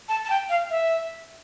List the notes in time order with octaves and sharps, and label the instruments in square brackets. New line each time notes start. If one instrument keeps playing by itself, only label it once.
[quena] A5
A5
G5
F5
E5